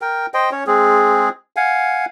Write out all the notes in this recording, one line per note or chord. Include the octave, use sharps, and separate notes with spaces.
A#4 G5
C5 D#5 G5
C#4 C#5
G#3 C4 G#4
F5 F#5 G#5